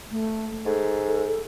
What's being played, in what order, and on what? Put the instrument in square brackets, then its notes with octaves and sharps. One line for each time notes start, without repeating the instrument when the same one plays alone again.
[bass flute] A3
[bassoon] G#2 [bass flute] A4